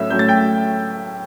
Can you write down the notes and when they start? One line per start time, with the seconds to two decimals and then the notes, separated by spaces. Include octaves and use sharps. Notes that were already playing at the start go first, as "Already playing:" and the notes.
Already playing: A2 F#3 A3 C#4 E5 E6
0.10 A2 F#3 A3 C#4 G6
0.19 A6
0.28 G5 G6